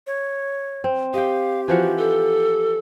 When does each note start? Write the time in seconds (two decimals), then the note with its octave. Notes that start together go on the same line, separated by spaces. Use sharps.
0.07 C#5
0.84 C4
1.14 G4 D#5 F5 G5
1.68 E3 F3 F#4 F#5
1.98 A4